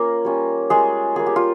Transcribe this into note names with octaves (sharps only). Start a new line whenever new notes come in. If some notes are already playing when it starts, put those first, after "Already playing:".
Already playing: A#3 C#4 F4 A#4
G3 C#4 F4
G3 G#3 A#3 F4 G#4
G3 A#3 F4 G#4
G4
F4